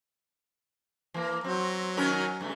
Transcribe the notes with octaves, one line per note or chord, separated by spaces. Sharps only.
E3 A#3
F#3 C4
D#3 C#4 A#4
G2 C#3 A3